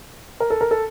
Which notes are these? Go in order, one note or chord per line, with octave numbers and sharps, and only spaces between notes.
A#4
A4
A#4
A4